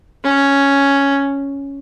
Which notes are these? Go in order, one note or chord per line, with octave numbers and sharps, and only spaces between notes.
C#4